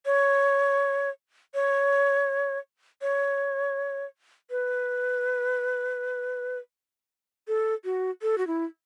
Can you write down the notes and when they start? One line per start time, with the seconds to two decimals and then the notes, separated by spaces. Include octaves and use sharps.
0.06 C#5
1.54 C#5
3.02 C#5
4.51 B4
7.48 A4
7.85 F#4
8.22 A4
8.38 F#4
8.47 E4